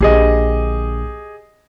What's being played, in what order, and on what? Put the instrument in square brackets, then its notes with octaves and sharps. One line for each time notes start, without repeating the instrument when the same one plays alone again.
[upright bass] A#1 D3 [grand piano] G4 G#4 D#5